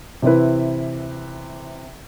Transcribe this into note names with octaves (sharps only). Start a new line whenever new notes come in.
C3 E3 C4 E4 B4